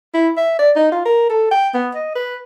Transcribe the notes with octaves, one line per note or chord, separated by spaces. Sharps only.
E4
E5
D5
D#4
F4
A#4
A4
G5
B3
D#5
B4